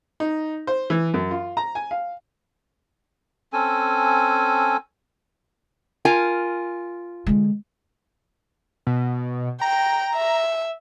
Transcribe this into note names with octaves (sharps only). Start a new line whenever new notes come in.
D#4
C5
E3
F#2
F4
A#5
G#5
F5
C4 C#4 A4 G#5
F4 A#4 G#5
D3 G#3
B2
G5 A#5
E5